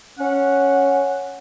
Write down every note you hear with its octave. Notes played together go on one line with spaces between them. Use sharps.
C#4 F#5